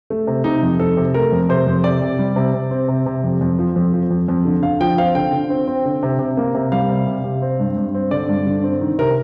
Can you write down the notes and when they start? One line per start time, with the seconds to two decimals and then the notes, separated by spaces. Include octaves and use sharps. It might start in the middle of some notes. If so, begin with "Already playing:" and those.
0.10 A3
0.27 C3
0.44 C3 D#4
0.63 F2
0.80 F2 A4
0.97 C3
1.14 A3 A#4
1.32 F2
1.49 C3 C5
1.67 F2
1.84 C3 D5
2.02 C3
2.19 G3
2.36 C3
2.54 C3
2.71 C4
2.88 C3
3.06 C3
3.24 F2
3.41 F2
3.59 F3
3.76 F2
3.93 F3
4.10 F2
4.28 F2
4.45 D3
4.62 D3 F5
4.81 F3 G5
4.98 C4 F5
5.15 D3 G5
5.33 D3
5.50 C4
5.67 C4
5.85 D3
6.03 C3
6.19 C3
6.37 A#3
6.55 C3
6.72 G3 F5
6.89 C3
7.07 C3
7.24 C3
7.42 C4
7.60 G2
7.77 G2
7.94 C4
8.11 D3 D5
8.29 G2
8.47 D3
8.63 C4
8.81 D#3
8.99 C3 A#4